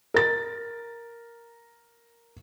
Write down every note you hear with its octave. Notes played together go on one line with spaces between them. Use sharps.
A#4 A6